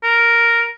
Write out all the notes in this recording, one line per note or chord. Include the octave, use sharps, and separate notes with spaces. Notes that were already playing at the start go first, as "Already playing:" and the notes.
A#4